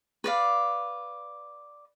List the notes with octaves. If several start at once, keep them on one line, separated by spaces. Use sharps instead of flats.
B4 D5 F5